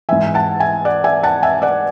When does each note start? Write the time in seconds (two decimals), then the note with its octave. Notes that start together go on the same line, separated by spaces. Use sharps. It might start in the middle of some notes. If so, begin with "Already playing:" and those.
0.09 G#2 E3 E5 G#5
0.34 F#5 A5
0.59 E5 G#5
0.85 D5 F#5
1.04 E5 G#5
1.23 F#5 A5
1.43 E5 G#5
1.62 D5 F#5